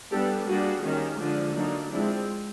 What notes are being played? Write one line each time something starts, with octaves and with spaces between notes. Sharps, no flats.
G3 B3 D4 G4 A4
G3 A#3 D4 F#4 G#4
D#3 G3 A#3 C#4
D3 F3 G#3 D4
F#3 A#3 D4 D#4
F3 G#3 C4 D4 E4